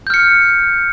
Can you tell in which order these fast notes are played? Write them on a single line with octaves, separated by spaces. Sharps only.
G6 F6 C#7